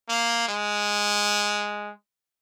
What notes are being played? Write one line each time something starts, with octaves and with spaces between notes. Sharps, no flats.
A#3
G#3